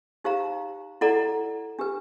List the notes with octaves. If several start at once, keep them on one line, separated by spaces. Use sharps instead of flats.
D#4 G4 C5 F5 A#5
E4 A4 D5 F#5 A#5
D4 G4 B4